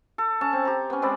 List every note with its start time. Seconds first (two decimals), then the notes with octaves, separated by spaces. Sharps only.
0.18 A4
0.41 C#4 A5
0.53 C4
0.65 G4 A#5
0.90 B3 C#4
1.02 G#3 C4 D5 B5